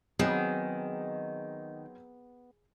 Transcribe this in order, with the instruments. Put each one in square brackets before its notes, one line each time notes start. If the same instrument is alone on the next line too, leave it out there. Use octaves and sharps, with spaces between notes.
[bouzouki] D#3 [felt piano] F#3 C4 [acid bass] B3 [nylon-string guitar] G#4